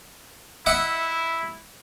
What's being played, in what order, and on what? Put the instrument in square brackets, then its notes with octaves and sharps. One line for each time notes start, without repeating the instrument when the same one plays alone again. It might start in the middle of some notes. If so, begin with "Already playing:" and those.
[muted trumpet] E4 [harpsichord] D#5 E5 F#5